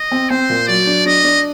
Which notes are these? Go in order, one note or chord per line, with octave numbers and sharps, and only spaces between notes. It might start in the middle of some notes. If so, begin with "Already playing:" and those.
Already playing: D#5
C4
C4 C5
A#2
F#3 D5
D4
D4 D#5
D4